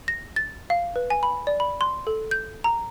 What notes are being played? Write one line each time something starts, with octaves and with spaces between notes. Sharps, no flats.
A#6
A6
F5
B4
G#5
B5
D5
B5
C6
A4
G6
A#5